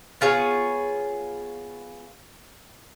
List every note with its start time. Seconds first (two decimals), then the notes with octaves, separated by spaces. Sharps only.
0.21 B3 F4 G#4 C#5